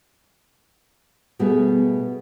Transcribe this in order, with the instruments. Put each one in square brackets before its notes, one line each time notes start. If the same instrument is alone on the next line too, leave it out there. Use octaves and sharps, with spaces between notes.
[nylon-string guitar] B2 G3 A3 B3 G#4